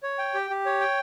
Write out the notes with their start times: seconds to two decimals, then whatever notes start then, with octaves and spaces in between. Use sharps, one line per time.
0.03 C#5
0.18 G5
0.34 G4
0.50 G4
0.66 C#5
0.80 G5